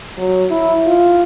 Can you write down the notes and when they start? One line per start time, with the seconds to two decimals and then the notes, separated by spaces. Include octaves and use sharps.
0.17 F#3
0.50 E4
0.86 F4